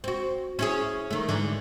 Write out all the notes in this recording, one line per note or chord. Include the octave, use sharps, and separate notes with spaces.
C4 F#4
C#4 E4 G#4
D#3 A3
G#2 D3 E3